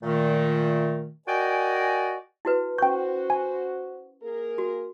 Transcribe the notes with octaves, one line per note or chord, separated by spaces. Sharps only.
A#2 D#3 A3
F#4 A#4 D5 D#5 G5 G#5
E4 F#4 B4
C#4 F#4 C5 G5 C#6 G6
G#5
A#3 G#4 A#4
F#4